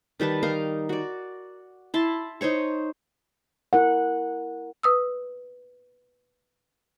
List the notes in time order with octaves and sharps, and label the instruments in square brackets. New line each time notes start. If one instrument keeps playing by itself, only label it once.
[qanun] D#3 G3 B4 A5
D#4 A#4 F5
F#4 D5
E4 A5 C6
D#4 C5 C#5 C#6
[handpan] E4 A#4 F#5
[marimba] B4 D#6 E6